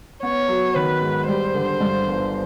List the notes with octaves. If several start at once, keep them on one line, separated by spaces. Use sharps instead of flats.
B3 C#5
F#3
D#3 B4
G#2
G3 C5
D3
G2
G1